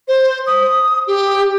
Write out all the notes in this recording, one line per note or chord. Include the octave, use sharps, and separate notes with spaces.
C5
D#6
G4